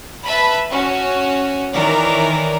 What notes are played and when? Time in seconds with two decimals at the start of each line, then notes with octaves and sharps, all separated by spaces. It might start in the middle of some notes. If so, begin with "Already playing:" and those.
0.24 B4 E5 A5 B5
0.71 C#4 F#4
1.73 D#3 E3 A#4 C#5 D5